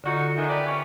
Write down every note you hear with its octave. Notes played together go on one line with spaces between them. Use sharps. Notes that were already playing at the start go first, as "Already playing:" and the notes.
D3 D#4 F4 F#4 A4
D3 D#3 E5 G#5 A#5
G4 B4 D5
C#4